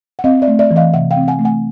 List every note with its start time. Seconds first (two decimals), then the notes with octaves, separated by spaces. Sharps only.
0.19 F#5
0.24 C4 D#5 F5
0.42 D5 E5
0.48 A3
0.59 D5 E5
0.71 E3
0.76 D#5 F5
0.94 C3 E5 F#5
1.11 F5 G5
1.17 C4
1.28 F#5 G#5
1.39 A3
1.45 F#5 G#5